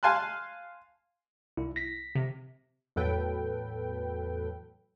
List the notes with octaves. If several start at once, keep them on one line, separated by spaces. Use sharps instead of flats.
F5 G#5 A5 C6 F#6
C2 E4
A#6 B6
C3
E2 A2 F#3 A4 B4 G5